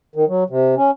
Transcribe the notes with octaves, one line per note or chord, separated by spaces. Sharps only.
D#3
F#3
C3
C#4